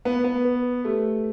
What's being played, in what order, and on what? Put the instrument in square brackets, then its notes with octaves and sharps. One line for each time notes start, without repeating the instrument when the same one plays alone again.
[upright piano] B3 [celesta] B4
[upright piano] B3
[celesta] B4
[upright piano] A3 [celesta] G4